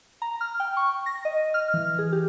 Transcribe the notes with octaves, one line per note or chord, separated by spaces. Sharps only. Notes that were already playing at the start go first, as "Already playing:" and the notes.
A#5
F6
G5
C#6
A#6
D#5
F6
E3
G#4
G4